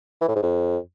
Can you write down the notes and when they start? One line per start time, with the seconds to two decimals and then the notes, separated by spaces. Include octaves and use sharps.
0.21 E3
0.28 A2
0.35 G#2
0.43 F2